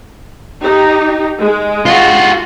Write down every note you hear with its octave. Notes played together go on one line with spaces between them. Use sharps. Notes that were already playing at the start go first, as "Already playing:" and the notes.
D#4 G4
G#3
F4 F#4